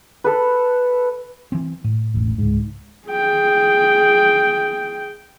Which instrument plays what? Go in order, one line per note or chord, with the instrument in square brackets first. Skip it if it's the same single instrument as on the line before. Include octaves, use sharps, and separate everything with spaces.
[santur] A4 B4
[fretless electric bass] E3 C4
A2
[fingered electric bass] E1 A1
C#2 G#2
[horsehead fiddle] G#4 G5